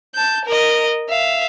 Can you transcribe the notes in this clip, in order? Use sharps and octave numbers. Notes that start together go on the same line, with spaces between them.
A5 G6
A#4 D#5
E5 F5